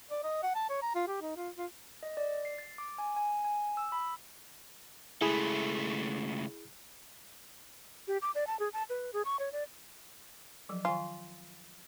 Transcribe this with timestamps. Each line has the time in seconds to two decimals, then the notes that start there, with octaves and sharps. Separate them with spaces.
0.11 D5
0.24 D#5
0.43 F#5
0.55 A5
0.70 C#5
0.82 A#5
0.95 F4
1.08 G4
1.22 D#4
1.37 F4
1.58 F4
2.03 D#5
2.17 D5
2.45 C7
2.58 A6
2.78 D6
2.98 G#5
3.16 G#5
3.45 G#5
3.77 E6
3.92 B5
5.21 C#2 A3 E4 G#4 B5
8.08 G4
8.22 D6
8.35 D5
8.47 A5
8.59 G#4
8.73 A5
8.90 B4
9.13 G#4
9.25 C#6
9.39 C#5
9.52 D5
10.69 F3 F#3
10.85 D#3 F4 G#5